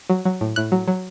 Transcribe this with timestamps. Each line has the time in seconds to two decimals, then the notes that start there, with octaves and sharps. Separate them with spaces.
0.10 F#3
0.25 F#3
0.41 A2
0.56 A2 F#6
0.72 F#3
0.88 F#3